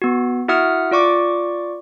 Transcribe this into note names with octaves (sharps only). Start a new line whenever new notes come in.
B3 F#4
E4 F#4 E5 F#5 D#6 F6
F4 D5 C#6 D6